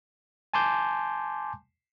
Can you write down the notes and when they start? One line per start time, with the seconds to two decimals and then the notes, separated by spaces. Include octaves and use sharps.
0.54 G#5 A5 C6 D6 G6